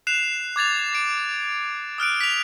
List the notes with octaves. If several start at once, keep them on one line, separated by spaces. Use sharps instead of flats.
F#6 C7 E7 F7
D6 G#6 A6 F7
A6 D7
D#6 F6 F#6 D7
B6 F7